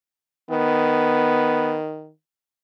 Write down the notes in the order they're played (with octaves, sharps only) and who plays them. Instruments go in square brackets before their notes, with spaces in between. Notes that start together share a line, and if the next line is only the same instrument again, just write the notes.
[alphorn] D#3 [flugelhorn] B3